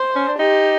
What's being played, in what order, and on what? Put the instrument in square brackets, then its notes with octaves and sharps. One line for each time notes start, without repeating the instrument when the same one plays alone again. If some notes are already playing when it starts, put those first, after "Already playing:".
Already playing: [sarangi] C5
[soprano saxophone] C#4
D4
[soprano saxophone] D#4 [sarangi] G4